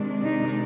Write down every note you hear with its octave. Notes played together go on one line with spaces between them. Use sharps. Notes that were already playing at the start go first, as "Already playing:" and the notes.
Already playing: C3 D#3 G#3 D4
D#4